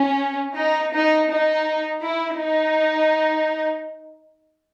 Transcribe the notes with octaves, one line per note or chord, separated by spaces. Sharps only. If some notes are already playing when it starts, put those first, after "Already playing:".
Already playing: C#4
D#4
D#4
D#4
E4
D#4